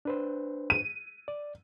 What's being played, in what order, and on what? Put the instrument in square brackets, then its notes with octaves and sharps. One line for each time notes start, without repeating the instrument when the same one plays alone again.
[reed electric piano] D4 B4 C5
[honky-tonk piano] D#7
[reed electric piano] D5